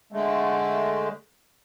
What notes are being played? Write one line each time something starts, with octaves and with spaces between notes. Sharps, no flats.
D3 G#3 A3